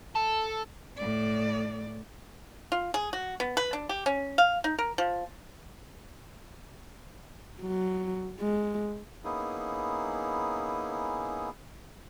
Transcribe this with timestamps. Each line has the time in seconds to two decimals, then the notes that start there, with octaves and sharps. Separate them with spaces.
0.16 A4
0.97 A2 D5
2.72 F4
2.94 G#4
3.13 F#4
3.40 B3
3.57 B4
3.73 D4
3.89 G4
4.06 C#4
4.38 F5
4.64 D#4
4.78 A#4
4.98 F3
7.62 F#3
8.40 G#3
9.24 A#3 B3 C#4 D#4 E4 G#4